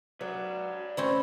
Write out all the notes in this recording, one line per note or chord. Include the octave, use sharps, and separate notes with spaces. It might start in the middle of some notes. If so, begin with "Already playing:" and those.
F#3 B4 D5
A3 C4 C#4 E4 C5